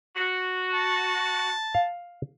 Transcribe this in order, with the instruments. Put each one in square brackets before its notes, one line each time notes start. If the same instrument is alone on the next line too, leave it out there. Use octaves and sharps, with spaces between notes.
[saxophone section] F#4
[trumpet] A5
[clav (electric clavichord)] F5